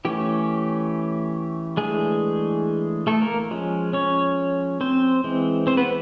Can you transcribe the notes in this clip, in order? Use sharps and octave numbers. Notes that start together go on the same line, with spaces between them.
E3 A3 C#4 G4
E3 G#3 A3 D4 G#4
A3 A4
A#3 A#4
F3 G#3 C#4
C#4 C#5
C4 C5
E3 G#3 C4
C4 C5
B3 B4